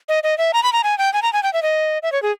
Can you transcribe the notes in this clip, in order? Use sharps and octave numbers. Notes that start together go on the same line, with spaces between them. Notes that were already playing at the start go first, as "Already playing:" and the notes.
D#5
D#5
E5
A#5
B5
A#5
G#5
G5
G#5
A#5
G#5
G5
E5
D#5
E5
C#5
G#4